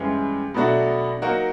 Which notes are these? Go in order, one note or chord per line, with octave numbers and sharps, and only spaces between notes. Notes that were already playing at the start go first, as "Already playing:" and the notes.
Already playing: G2 E3 G#3 C#4
B2 F#3 A3 D4 F#4
F#3 A#3 D#4 F#4 A#4